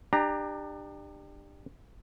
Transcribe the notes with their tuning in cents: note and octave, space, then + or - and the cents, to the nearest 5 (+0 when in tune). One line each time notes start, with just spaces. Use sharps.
D4 +30 G4 +20 A#5 +0